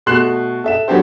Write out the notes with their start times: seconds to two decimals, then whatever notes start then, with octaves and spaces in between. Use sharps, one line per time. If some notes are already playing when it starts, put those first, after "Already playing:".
0.06 B2 A3 C6 F#6 C7 E7
0.64 A4 E5 E7
0.88 F#3 B3 D4 G4 A4 C5